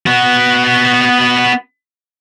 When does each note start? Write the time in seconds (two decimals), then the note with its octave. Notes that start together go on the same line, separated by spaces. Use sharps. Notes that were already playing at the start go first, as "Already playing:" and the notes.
0.06 B3 F#4